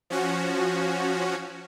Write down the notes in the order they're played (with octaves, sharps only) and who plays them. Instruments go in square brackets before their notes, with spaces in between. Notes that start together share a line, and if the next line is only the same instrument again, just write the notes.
[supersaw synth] F3 C#4 F#4